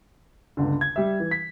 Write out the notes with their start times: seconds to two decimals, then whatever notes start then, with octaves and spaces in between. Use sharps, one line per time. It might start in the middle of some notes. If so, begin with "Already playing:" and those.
0.57 G1 C#2 D3
0.81 G#6
0.96 G3 E5
1.20 E3
1.31 B6